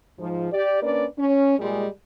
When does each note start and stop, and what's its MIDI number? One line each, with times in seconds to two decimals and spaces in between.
0.19 0.48 44
0.19 0.48 53
0.52 0.82 67
0.52 0.82 74
0.83 1.06 58
0.83 1.06 61
0.83 1.06 62
0.83 1.06 71
0.83 1.06 74
1.19 1.56 61
1.58 1.87 46
1.58 1.87 55
1.58 1.87 56